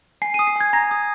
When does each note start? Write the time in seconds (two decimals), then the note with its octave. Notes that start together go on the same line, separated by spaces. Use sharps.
0.22 G#5 C7
0.34 D#7
0.39 D#6
0.47 C7
0.56 G#5 G#6
0.73 A#5 A#6
0.91 D#6